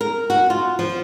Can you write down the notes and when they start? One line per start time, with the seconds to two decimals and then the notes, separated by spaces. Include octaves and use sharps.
0.01 A#4
0.30 F#4
0.50 F4
0.79 F3